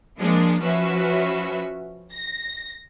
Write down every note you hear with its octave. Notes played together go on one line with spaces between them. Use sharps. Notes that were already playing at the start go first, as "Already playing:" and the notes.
F3 G#3 A#3 D4
F3 C#4 F#4 B4 E5
A#6